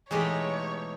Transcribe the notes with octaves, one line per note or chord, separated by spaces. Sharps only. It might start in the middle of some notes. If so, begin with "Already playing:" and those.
E2 B2 G#3 A3 D#4 G4 C#5